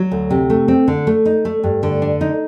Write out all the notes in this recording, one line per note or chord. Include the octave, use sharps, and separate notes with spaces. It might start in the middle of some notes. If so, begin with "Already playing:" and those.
Already playing: F#3
D2
C3
A3
C4
D3
A3
D#4
A3
G2
D3
D4
D#4